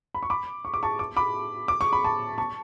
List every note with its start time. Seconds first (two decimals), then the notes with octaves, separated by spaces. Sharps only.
0.15 B5
0.23 C#6
0.30 B5 D6
0.65 C#6
0.74 D6
0.83 A5 C#6
0.99 D6
1.17 B5 D6
1.68 D6
1.81 C#6
1.93 B5
2.04 A5 C#6
2.38 A5 C#6